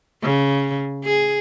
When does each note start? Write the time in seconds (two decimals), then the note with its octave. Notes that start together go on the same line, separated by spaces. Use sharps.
0.22 C#3
1.05 G#4